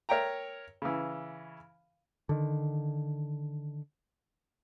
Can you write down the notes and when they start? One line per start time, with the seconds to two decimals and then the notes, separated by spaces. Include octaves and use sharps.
0.09 A#4 C#5 E5 G5 A#5
0.82 C#3 E3
2.29 D3 D#3